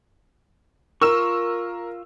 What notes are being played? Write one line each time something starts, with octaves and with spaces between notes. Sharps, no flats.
F4 A#4 C#6 E6 E7